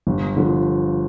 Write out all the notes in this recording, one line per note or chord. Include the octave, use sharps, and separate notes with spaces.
G1
D3 F3